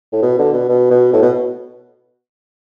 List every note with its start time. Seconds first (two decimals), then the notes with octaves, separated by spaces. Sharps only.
0.13 A2
0.22 B2
0.38 D3
0.53 B2
0.69 B2
0.90 B2
1.13 A2
1.22 B2